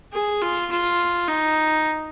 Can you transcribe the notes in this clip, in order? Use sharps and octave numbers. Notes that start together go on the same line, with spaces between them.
G#4
F4
F4
D#4